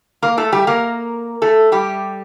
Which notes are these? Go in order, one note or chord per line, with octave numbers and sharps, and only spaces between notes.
A#3 A#4
A3 A4
G3 G4
A#3 A#4
A3 A4
G3 G4